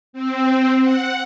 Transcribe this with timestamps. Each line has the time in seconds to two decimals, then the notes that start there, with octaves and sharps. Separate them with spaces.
0.13 C4
0.83 F#5